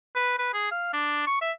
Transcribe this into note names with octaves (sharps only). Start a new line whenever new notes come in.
B4
B4
G#4
F5
D4
C#6
E5